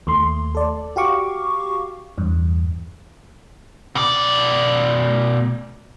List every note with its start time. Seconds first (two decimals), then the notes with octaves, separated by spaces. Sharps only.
0.07 D#2 A3 C6
0.55 A4 D5
0.96 F#4 G4 F5 C#6 D6
2.18 E2 G2
3.95 B2 D5